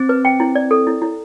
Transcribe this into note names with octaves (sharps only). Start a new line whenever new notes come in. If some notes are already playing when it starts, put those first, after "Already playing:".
Already playing: C4
B4
G5
E4
D5
A4
E4
E4